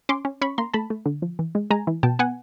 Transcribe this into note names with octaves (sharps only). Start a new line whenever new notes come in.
C#4 C6 D6
C#4
C#4 B5 C#6
A#3 A#5 C6
A3 A5 B5
A3
D3
F3
E3
G#3
G#3 G#5 A#5
E3
B2 G5 A5
B3 F#5 G#5